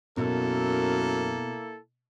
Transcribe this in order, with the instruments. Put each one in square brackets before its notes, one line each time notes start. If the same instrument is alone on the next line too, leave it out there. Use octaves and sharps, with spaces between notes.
[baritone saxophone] F#2 [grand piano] B2 [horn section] A#3 E4 A4